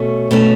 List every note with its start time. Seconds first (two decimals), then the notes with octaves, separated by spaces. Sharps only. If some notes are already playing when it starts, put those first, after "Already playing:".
Already playing: B2 A3 C#4
0.31 B2 A3 C#4